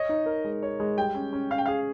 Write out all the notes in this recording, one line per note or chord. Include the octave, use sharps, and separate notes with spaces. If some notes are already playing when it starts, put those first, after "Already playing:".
Already playing: C#5 D#5
D#4
A#4
G#3
C#5
G#3
G3 G5
C#4
C#4
C#4 F5
G5
G#4 F5